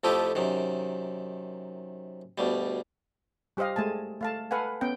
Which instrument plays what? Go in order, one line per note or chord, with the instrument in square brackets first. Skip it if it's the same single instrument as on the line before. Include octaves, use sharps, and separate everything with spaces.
[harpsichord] F2 F3 A3 E4 G4 D#5
F#2 C3 D#3
D2 B2 G3
[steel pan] G3 G4 C5 D#5 F5
G#3 A3 G#5 A5
A3 F5 A5
A4 B4 F5 F#5 G#5
B3 C#4 G5